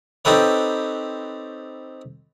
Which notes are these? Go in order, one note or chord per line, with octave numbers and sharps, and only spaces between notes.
C4 D#4 G4 A4 B4 C#5